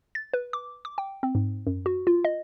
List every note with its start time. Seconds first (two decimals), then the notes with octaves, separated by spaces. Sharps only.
0.15 A6
0.34 B4
0.53 D6
0.85 D6
0.98 G5
1.23 C4
1.35 G#2
1.67 F#2
1.86 F#4
2.07 F4
2.25 D#5